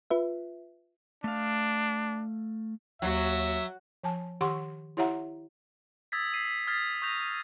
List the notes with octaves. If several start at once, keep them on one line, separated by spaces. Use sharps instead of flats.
F4 B4 E5
A3 D4 F5
D#2 F#3 F#4 E5
F3 G#5 A5
D#3 G4 F#5 C6 C#6
E4 G4 C#5 E5 F#5 A#5
D#6 E6 G#6 A6 B6
B6 C7 D#7
B6
D#6 F6 G#6 A6 B6 C7
C#6 D#6 G6 A#6 F7